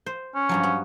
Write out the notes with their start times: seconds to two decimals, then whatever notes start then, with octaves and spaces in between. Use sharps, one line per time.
0.06 C5
0.35 C#4
0.49 G2 F3 F#3
0.63 B3